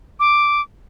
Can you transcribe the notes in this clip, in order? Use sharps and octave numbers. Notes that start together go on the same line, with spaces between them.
D6